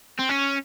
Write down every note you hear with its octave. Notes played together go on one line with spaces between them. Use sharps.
C4
C#4